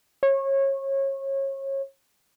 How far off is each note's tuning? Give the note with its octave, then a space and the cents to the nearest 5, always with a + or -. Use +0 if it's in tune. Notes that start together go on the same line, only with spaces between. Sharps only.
C#5 -30